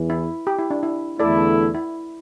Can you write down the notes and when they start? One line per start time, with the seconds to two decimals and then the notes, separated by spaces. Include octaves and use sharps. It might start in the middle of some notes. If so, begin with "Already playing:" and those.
Already playing: E2 E3
0.10 E4
0.47 G4
0.58 E4
0.70 D4
0.83 E4
1.19 E2 D3 A3 E4 A4 D5
1.75 E4